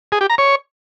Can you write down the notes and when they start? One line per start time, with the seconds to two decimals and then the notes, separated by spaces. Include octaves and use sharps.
0.12 G#4
0.21 G4
0.30 A#5
0.38 C#5